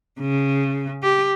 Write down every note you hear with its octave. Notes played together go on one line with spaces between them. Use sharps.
C#3
G4